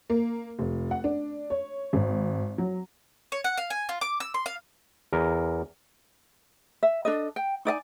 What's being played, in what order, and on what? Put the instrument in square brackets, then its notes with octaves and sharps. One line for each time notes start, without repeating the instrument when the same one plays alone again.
[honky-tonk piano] A#3
F1
F#5
D4
C#5
G#1
F#3
[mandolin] C#5
F#5
F5
G#5
F4
D6
E6
C6
F5
[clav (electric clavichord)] E2 A#4
[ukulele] E5
D4 A4 D#5
G5
D#4 D5 E5 G#5